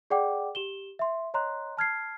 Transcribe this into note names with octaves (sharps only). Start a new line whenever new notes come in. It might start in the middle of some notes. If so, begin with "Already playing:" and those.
G#4 D5 F#5 G5 D6
G4 E7 G7
E5 C6
C#5 D#5 A#5 C6 F#6
A5 F6 G#6 C7